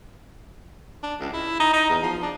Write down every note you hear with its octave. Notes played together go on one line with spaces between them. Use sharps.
D4
C#2
E4
D#4
D#4
E2
F3
D4